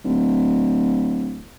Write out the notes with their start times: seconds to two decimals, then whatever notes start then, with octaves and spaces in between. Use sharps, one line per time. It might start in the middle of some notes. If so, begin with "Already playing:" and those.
0.05 D1